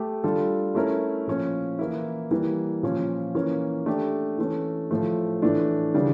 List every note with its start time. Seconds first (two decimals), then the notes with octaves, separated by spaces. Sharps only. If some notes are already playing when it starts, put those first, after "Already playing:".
Already playing: A3 G4
0.24 G3 D4 F4 A4
0.75 A3 C#4 E4 A#4
1.27 A#2 F3 C#4
1.79 E3 A#3 E4
2.31 E3 G3 A#3
2.83 A#2 F3 C#4
3.35 E3 A#3 C#4
3.86 A3 D4 G4
4.38 E3 A3 C#4
4.91 A2 F3 A3
5.42 A2 E3 A3 D4
5.94 C#3 E3 G3 D4